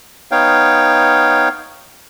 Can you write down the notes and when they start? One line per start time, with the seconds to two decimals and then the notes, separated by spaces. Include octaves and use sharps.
0.31 B3 D#4 C#5 F5 G5